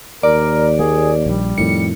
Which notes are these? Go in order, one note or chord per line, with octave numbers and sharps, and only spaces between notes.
D#2 A#4 D5
A#3 G#4
A#1 G3
F2 A2 D#3 C#7